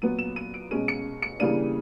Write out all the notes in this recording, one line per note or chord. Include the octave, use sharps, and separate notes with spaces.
A#2 F#3 B3 D#7
E7
D#7
D7
B2 G#3 C#4 D#7
C#7
C#7
C#3 E3 G3 A#3 D4 D#7